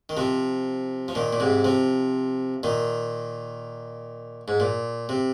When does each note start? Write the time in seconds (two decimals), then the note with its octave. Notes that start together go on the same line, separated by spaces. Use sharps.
0.09 D#3
0.17 C3 F3
1.08 F3
1.15 A#2 D#3
1.33 A#2
1.40 G#2 C3
1.64 C3 F3
2.63 A#2 D#3
4.48 G#2
4.60 A#2
5.09 C3